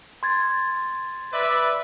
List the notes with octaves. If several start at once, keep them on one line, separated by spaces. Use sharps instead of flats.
C6 G#6 A6
B4 D5 E5